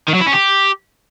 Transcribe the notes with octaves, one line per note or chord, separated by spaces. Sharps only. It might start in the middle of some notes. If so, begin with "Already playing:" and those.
D#3
F#3
E4
C#4
G4